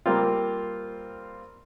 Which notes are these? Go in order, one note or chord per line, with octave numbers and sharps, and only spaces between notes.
G3 A#3 C4 F4